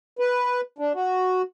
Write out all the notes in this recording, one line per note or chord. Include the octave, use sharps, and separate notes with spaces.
B4
D4
F#4